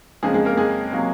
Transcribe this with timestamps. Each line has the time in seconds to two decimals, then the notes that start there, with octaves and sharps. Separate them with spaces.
0.23 F2 C#3 F3 G#3 A#3 G#4
0.34 G#3 G#4
0.45 A#3 A#4
0.57 G#3 G#4
0.92 C3 F#3 A#3